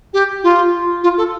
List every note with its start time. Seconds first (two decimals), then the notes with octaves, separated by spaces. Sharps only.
0.13 G4
0.43 F4
1.03 F4
1.17 A4